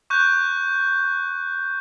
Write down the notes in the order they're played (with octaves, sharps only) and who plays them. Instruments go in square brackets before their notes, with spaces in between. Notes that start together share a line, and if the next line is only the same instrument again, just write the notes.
[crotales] C#6 F#6 G6